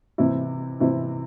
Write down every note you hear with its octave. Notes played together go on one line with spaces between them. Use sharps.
C3 E3 C4 E4
C3 E3 C4 E4